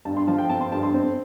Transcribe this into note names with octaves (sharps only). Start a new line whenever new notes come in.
G2 A5
C6
F3 A5
G5
C4 A5
C6
G2 A5
C6
C4